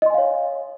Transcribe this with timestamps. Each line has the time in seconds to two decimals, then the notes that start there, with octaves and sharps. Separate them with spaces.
0.02 D#5
0.06 C6
0.10 G#5
0.14 F5
0.18 C#5